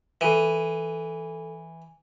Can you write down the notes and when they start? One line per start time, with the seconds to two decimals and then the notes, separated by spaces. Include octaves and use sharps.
0.21 E3 A4 D#7